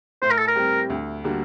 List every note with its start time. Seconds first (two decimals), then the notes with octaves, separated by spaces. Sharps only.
0.22 A2 C5
0.30 A#4
0.38 A4
0.47 A#4
0.55 G3 C4 G4
0.90 D2
1.24 D3 G3 A#3 F#4